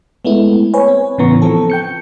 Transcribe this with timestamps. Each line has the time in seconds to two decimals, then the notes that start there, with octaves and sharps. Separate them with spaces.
0.25 G#3 A3 B3 E4
0.74 B4 C#5 G#5
0.88 C4
1.18 A2 C#3 E3 B3 A#5 C#6
1.42 F3 C4 A4
1.70 G5 G6 C#7